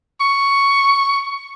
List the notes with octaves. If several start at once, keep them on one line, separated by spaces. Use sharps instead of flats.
C#6